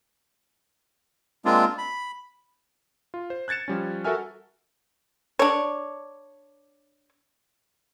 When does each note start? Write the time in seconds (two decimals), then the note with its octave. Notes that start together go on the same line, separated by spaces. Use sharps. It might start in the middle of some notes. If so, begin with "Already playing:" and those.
1.45 G#3 A#3 C4 D4 F4
1.78 B5
3.14 F4
3.30 C5
3.48 F#6 G#6 A6 C#7 E7
3.68 F3 G3 C#4
4.04 F#4 A4 A#4 E5 G#5 F6
5.39 D4 C#5